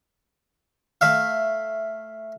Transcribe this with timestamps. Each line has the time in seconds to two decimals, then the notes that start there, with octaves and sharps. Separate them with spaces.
1.01 A3 E5 F5